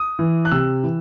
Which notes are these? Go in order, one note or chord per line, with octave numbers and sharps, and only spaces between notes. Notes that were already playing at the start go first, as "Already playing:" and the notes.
Already playing: D#6
E3
F#6
C3 E6
E3